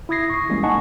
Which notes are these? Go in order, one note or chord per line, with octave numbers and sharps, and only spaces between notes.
E4 E5 D#6 G#6 A#6 C7
C#6 D#6
E3 G3 G#3 A#3 C#4
D#4 D#5 F#5 G#5 A5 C#6